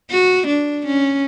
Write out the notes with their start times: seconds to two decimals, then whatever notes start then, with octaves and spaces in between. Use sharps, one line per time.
0.10 F#4
0.47 D4
0.86 C#4